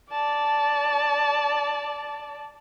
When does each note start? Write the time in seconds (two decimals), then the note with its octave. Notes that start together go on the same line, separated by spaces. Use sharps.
0.11 D5 A5